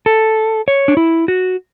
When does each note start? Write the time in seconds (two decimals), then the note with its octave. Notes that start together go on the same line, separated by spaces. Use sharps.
0.06 A4
0.68 C#5
0.88 D4
0.97 E4
1.28 F#4